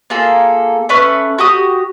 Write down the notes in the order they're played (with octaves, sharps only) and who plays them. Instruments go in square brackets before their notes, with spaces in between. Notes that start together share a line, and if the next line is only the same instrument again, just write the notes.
[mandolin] A#3 F4 G#4 A4
A3 C#4 B4 C#6
F#4 G4 D#6